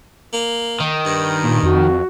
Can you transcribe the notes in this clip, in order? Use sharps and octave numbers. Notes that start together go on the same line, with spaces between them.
A#3
D#3
G2
A#2
F2 F#4